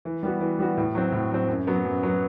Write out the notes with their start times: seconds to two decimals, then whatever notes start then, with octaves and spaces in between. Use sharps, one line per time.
0.05 E3
0.23 G3 B3 F#4
0.41 E3
0.59 G3 B3 F#4
0.77 A2
0.95 F#3 C4
1.12 A2
1.31 F#3 C4
1.48 F#2
1.67 F#3 B3
1.84 F#2
2.03 F#3 B3